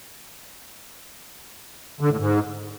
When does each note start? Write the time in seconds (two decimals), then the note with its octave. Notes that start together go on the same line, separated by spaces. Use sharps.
2.01 D3
2.10 A2
2.19 G#2